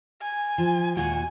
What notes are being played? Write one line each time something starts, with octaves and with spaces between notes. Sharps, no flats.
G#5
F3
D#2 A#2 F#4 G#5